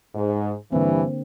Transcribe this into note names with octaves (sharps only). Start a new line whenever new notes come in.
G#2
G2 D3 E3 A#3 C4